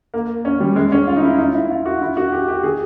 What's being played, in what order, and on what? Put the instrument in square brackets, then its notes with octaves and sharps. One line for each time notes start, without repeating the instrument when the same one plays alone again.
[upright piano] A#3
C#4
G3
G#3
C#4
F4
D#4
E4
D#4
E4
F4
F#4
E4
F#4
G4
G4
G#4